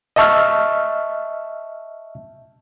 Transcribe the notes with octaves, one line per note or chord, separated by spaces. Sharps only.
D#5 E5 A5 C#6 E6 F6